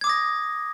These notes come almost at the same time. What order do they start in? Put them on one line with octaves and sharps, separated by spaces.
G#6 D6 D#6 A#6